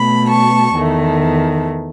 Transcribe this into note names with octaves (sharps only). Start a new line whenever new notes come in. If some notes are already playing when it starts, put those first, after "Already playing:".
Already playing: B2 A3 B5
A5 C#6
E2 D#3 A3